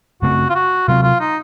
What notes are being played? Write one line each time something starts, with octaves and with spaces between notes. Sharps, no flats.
F#2 C#3 A3 C4 F#4
F4
F#4
C3 F#3 C4 F4
F4
D#4